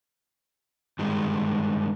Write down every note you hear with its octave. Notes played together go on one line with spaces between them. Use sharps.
G2 D#3 G#3